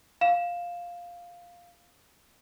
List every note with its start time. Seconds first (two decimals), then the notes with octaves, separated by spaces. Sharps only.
0.21 F5 E7